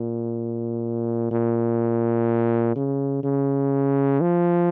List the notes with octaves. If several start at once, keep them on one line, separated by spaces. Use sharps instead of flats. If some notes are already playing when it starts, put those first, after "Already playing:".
Already playing: A#2
A#2
C#3
C#3
F3